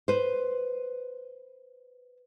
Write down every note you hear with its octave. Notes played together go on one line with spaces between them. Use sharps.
B4 C5